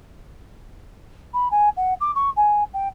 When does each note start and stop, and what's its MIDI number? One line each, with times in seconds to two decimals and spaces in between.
1.33 1.48 83
1.51 1.69 80
1.76 1.94 78
2.00 2.11 86
2.15 2.30 85
2.36 2.63 80
2.73 2.88 79